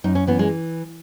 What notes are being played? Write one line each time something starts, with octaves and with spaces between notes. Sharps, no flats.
F#2 D#4
C#4
E3 B3
G#3